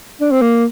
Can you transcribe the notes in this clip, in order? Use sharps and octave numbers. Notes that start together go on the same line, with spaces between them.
D4
C4
A#3